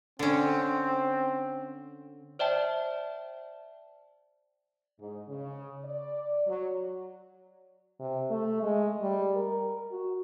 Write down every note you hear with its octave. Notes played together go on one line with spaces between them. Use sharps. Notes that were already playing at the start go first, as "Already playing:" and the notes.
D3 C4 C#4
C5 D5 E5 G5 A5
G#2
C#3
D5
F#3
C3
A3
G#3
G3
A#4
F#4